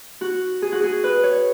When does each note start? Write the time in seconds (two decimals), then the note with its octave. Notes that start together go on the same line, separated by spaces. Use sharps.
0.21 F#4
0.62 G#4
0.72 F#4
0.84 G#4
1.04 B4
1.23 C#5